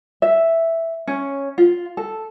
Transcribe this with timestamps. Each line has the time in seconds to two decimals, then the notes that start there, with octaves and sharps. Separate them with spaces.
0.22 E5
1.07 C#4
1.58 F4
1.97 A4